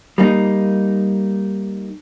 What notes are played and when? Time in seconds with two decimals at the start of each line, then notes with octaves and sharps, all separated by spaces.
0.18 G3 A#3 D#4